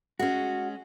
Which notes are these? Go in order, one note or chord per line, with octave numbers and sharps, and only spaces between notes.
G#3 C#4 F#4